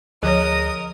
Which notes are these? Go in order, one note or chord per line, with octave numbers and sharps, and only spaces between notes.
D2 F3 G#4 A#4 C#5 D#5 D#6 F#6